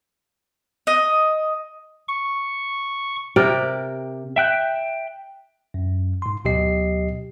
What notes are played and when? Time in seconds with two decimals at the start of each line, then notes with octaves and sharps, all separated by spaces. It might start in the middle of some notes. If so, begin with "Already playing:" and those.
0.87 D#5
2.08 C#6
3.36 C3 G4 A#4 D5
4.36 E5 G5 F#6 G6
5.74 F#2
6.22 G#2 C6
6.45 D2 B2 F#3 G4 D#5 C7